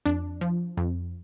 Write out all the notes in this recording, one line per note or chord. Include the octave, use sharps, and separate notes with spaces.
F2 D4
F3
F2